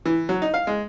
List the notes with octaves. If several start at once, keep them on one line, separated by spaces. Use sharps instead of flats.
E3
F#3
D#4
F5
G#3